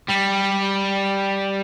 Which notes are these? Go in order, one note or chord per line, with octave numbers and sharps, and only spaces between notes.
G3